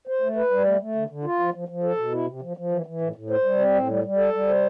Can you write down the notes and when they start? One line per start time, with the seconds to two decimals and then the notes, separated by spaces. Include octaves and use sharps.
0.07 C5
0.21 A3
0.36 B4
0.51 G3
0.65 A3
0.80 A3
0.95 D3
1.10 D3
1.24 F4
1.39 F3
1.54 F3
1.68 F3
1.83 A4
1.97 B2
2.12 E4
2.27 C3
2.42 F3
2.57 F3
2.71 E3
2.86 E3
3.01 A2
3.16 A2
3.30 C5
3.45 G3
3.59 C4
3.74 A2
3.88 G3
4.04 G3
4.17 A4
4.33 G3
4.48 C5